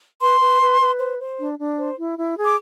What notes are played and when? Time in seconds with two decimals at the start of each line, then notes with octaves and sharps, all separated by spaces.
0.21 B4 C6
0.41 B4
0.61 B4
0.80 B4
0.99 C5
1.19 C5
1.38 D4
1.58 D4
1.77 C5
1.98 E4
2.17 E4
2.37 G#4
2.44 D6